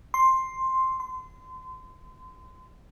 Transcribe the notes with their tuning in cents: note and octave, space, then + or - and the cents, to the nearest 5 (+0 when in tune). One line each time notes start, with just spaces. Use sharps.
C6 +5
C6 -30